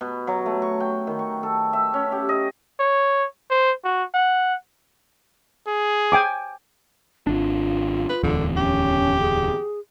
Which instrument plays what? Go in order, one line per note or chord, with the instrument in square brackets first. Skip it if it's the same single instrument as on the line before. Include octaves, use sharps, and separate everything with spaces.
[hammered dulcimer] B2
F#3
A3
C#6
G5
D#3
C#6
A4
E5
C#4
G4
D#5
[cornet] C#5
C5
F#4
F#5
[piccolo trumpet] G#4
[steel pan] G5 G#5 D6
[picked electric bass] G#1 D4 [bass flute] F4
[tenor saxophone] B4
[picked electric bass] D1 E2 [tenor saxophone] D3
[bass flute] C#4 [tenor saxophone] G4
[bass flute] G#4